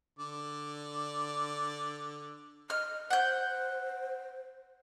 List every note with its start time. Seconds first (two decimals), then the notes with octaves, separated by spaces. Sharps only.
0.19 D3 D5
2.70 D#5 F6
3.10 C5 F#5 G6